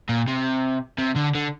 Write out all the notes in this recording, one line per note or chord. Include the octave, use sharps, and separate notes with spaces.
A#2
C3
C3
D3
D3